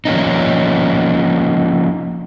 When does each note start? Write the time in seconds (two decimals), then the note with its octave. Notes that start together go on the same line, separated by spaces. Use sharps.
0.05 F3 A#3 C#4 D#4